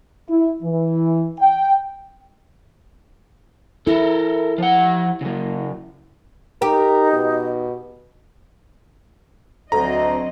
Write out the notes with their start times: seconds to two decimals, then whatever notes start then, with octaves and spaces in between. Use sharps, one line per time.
0.29 E4
0.62 E3
1.39 G5
3.87 E4 A4 A#4
4.58 F3 F#5
5.21 C#3 F#3
6.62 D#4 G4 A#4
7.13 B2
9.72 D2 F#3 C4 D#5 A#5